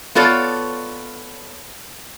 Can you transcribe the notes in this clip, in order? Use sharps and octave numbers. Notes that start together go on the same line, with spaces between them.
B3 F4 A4 C#5 D5